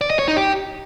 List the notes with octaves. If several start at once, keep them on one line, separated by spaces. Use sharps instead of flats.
D5
D#5
C#5
D#4
G4